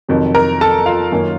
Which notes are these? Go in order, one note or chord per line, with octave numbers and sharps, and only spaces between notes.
F2 C3 D#3 F#3
A#4 A#5
A4 A5
F4 F5
F#2 D#3 A#3 C#4